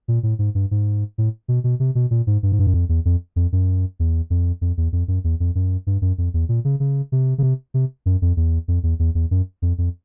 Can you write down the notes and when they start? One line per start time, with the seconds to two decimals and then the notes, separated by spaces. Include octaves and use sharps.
0.08 A#2
0.23 A2
0.39 G#2
0.55 G2
0.71 G#2
1.18 A2
1.48 B2
1.64 B2
1.80 C3
1.95 B2
2.11 A#2
2.27 G#2
2.43 G2
2.52 G#2
2.59 G2
2.67 F#2
2.74 F2
2.89 E2
3.05 F2
3.36 F2
3.52 F#2
4.00 E2
4.30 F2
4.61 F2
4.77 E2
4.93 F2
5.08 F#2
5.24 E2
5.40 F2
5.55 F#2
5.87 G2
6.02 F#2
6.18 F2
6.34 E2
6.49 A#2
6.65 C#3
6.80 C#3
7.12 C3
7.38 C#3
7.43 C3
7.74 C3
8.06 F#2
8.22 F2
8.37 E2
8.68 F2
8.83 E2
8.99 E2
9.15 E2
9.31 F#2
9.62 F2
9.78 F2